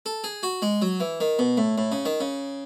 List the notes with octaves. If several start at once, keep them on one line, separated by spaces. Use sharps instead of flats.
A4
G#4
F#4
G#3
F#3
E3
D#3
B2
A2
A2
C#3
D#3
C#3